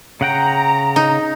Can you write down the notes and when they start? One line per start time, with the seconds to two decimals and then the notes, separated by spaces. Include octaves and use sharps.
0.21 C#3 F#5 G5 A#5
0.96 D#4